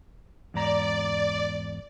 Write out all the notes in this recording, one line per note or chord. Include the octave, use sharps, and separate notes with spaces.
E2 G#2 D5 A#5